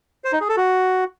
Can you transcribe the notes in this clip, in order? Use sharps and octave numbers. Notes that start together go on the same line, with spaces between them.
C5
D#4
G#4
A4
F#4